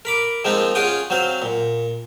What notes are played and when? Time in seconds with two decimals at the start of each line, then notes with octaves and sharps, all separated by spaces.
0.05 A#4 B5 D6
0.44 F3 G#3 A#3 C4 D#4 F4
0.75 C#4 F4 G#4 F#5 G5 D#6
1.10 F#3 C4 C5 F5
1.42 A#2